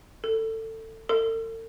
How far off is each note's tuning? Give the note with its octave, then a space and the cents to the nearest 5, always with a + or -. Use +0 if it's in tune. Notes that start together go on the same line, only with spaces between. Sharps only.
A4 +20
A4 +45